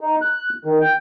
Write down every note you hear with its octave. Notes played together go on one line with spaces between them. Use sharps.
D#4
F#6
D#3
G5